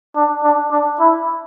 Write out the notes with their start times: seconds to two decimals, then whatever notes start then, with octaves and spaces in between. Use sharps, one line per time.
0.16 D4
0.44 D4
0.71 D4
1.00 E4